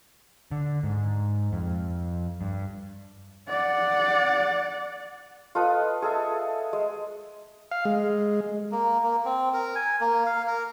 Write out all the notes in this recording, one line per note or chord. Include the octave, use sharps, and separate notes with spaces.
D3
G#2
F2
G2
D5 F#5
F4 A4 B4 D#5
G#4 A4 E5
G#3
F5
G#3
A#3
A#3
C4
A#4
G#5
A#3
F5
A#4